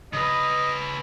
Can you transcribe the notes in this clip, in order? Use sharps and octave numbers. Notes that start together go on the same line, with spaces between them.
C#3 B4 D#5